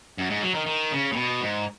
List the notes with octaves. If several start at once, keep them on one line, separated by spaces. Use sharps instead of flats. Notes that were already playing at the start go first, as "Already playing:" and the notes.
F#2
G#2
F#3
D#3
D#3
C#3
A2
B2
G#2